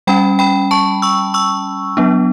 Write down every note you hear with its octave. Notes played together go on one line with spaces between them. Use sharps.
G3 C#4 G5 B5
G5 B5
A5 C#6
C#6 E6
C#6 E6
F#3 B3 D4